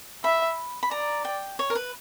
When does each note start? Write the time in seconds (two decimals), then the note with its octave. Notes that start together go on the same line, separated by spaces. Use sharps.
0.24 E5 B5
0.83 B5
0.91 D5 A#5
1.25 G5
1.59 C#5
1.70 A#4
1.75 B4